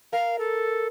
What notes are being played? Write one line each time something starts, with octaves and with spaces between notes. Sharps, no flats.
A#4 F5
A4